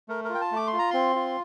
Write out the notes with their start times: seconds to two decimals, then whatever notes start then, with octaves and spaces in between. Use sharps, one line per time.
0.08 A3 A#4
0.24 A#4
0.29 F4
0.35 G5
0.41 A5
0.52 A3 D6
0.67 C6
0.73 F4
0.79 A#5
0.90 C4 C6
1.15 F4